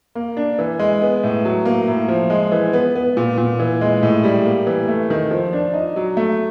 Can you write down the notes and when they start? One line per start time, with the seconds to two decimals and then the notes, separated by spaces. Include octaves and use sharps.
0.15 A#3
0.37 D4
0.59 E3
0.79 G#3
1.02 B3
1.24 A2
1.45 F#3
1.65 A#3
1.88 A2
2.08 F3
2.30 G#3
2.52 E3
2.73 B3
2.95 B3
3.17 A#2
3.38 A#2
3.59 E3
3.81 G#3
4.03 A2
4.24 G3
4.45 A#3
4.67 E3
4.88 A3
5.10 D#3
5.31 F3
5.53 D4
5.74 D#4
5.96 F#3
6.17 A3